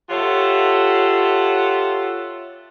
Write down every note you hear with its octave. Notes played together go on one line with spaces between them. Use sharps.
F4 G4 A4 C#5 E5 F#5